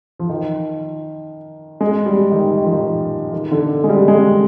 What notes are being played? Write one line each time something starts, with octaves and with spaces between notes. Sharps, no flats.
F3
D#3
G#3
G3
D#3
D#3
F3
D#3
D#3
D3
G#3
G3
G#3